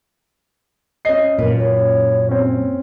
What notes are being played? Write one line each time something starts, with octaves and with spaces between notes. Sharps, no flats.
C#4 G#4 C5 D#5 C7
F#2 A#2 A#4 B4
C#5
C4 C#4